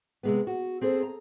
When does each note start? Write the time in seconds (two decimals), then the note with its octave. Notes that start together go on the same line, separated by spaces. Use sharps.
0.23 C3 G#3 B3
0.47 F#4
0.81 C4 G#4 A4 C5
1.03 A#5